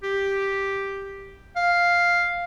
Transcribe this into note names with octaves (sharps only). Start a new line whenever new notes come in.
G4
F5